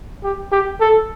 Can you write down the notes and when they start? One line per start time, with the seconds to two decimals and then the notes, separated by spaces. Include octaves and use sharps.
0.24 G4
0.52 G4
0.81 A4